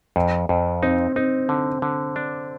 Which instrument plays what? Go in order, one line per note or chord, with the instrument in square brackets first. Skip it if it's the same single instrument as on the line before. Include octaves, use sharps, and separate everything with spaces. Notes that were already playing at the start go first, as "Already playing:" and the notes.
[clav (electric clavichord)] F2
F2
[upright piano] C4 [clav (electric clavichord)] D#4
[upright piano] C4 [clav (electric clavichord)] D#4
[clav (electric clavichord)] D3
D3
D4